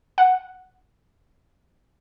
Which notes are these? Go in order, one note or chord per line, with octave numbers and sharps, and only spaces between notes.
F#5